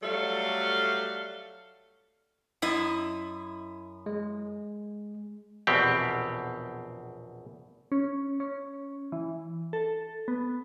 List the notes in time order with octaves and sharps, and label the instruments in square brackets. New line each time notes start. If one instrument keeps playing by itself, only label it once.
[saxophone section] F#3 G3 A3 A4 F5
[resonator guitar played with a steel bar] F#2 E4 D#5
[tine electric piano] G#3
[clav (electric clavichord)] A#1 E2 B2 C4 G4
[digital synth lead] C#4
C#4
E3
A4
B3